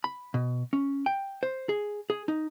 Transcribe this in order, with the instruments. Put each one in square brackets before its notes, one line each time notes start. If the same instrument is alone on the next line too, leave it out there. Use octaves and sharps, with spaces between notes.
[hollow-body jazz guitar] B5
B2
C#4
G5
C5
G#4
G#4
D#4